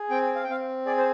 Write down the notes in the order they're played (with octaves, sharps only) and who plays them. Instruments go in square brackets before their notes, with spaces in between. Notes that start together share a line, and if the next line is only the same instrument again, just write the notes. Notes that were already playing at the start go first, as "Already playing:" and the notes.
Already playing: [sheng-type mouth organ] G#4
C4 G5
F5
G5
C4 F5
G#4 D5
C5